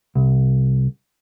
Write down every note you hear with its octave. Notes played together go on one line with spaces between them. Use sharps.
C2